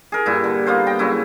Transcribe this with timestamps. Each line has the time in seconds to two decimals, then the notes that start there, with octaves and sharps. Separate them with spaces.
0.12 G#4 A#4
0.26 G2 A#2 E4
0.44 D3
0.67 A#3 B3 F4 C5
0.87 G5 A#5
0.99 C#3 F#3 E4